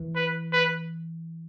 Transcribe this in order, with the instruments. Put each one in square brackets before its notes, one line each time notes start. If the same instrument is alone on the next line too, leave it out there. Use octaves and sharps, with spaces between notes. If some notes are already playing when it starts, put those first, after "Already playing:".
Already playing: [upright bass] E3
[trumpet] B4
B4